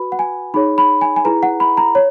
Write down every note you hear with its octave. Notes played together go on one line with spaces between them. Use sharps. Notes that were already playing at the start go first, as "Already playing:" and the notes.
Already playing: F#4 B4 B5
F#5
G#5
D#4 G#4 C#5 B5
B5
G#5
G#5
E4 G#4 B4 A#5
F#5
B5
A#5
C#5